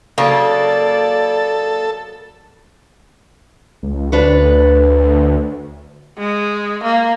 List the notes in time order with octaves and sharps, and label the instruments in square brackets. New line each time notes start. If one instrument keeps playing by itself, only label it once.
[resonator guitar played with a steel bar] C#3 F#3 [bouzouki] A#3 [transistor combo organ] A4 [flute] D5
[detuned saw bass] C#2
[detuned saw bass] D2 [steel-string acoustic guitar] D4 B4 C#5
[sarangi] G#3
A#3